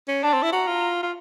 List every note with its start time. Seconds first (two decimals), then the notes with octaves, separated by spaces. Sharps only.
0.08 C#4
0.23 D4 A5
0.33 C4
0.43 E4
0.52 F#4 A#5
0.67 F4
1.03 F4